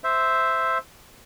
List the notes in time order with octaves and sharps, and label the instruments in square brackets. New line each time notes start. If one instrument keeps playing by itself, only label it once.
[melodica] C5 E5